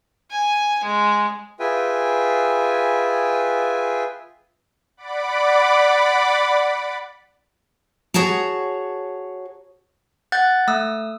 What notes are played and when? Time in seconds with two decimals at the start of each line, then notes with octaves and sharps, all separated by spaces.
0.31 G#5
0.83 G#3
1.60 F4 G#4 B4 E5 G5 G#5
4.97 D5 F#5 B5 D6
8.14 F#4 G#4 C#5 A5 A#5
10.32 F#5 F#6 G6 A6
10.68 A3 D#6 E6